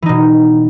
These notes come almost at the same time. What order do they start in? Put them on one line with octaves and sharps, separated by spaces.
E3 D#4 B2